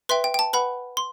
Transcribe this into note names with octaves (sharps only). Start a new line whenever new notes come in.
B4 E5 G5 C6
G5
G5
A5
B4 F#5 B5
C6